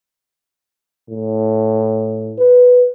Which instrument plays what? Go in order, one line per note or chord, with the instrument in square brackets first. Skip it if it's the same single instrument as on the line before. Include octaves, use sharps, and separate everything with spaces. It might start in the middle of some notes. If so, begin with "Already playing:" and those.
[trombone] A2
[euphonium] B4